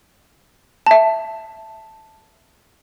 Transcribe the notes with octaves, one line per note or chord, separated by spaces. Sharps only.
E5 A5